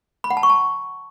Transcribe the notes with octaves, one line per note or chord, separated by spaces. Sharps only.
B5
F#5
A5
C#6
A5